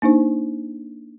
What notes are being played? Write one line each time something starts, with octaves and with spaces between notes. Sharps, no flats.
A#3 D4 D#4 C5